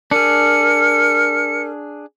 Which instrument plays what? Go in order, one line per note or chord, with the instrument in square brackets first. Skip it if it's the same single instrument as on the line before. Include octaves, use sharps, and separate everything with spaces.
[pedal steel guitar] D4 G#4 [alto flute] A#4 [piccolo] C#7